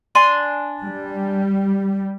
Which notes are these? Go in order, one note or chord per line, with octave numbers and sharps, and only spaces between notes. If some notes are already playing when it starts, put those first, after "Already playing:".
D4 G#5 C6
G3